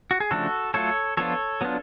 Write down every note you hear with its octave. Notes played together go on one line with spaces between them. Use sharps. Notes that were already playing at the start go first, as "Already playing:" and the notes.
F#4
G#4
C#3 F3 A3 D4 F#4 A4
F#3 A3 F4 A4 C#5
F3 B3 D4 F4 A4 C#5
F#3 B3 D4 F4